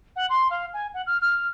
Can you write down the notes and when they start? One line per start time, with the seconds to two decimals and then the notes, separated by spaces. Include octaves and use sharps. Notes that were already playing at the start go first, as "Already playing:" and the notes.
0.16 F#5
0.30 C6
0.51 F5
0.74 G#5
0.94 F#5
1.06 F6
1.22 F6